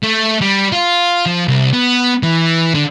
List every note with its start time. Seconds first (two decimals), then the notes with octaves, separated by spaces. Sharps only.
0.03 A3
0.41 G3
0.72 F4
1.26 F3
1.48 C2
1.73 B3
2.23 E3
2.75 D3